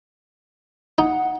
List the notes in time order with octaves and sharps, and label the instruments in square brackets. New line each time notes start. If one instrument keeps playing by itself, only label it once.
[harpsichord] D#4 [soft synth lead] F#5